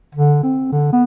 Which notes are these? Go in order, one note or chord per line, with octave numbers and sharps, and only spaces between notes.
D3
C4
D3
B3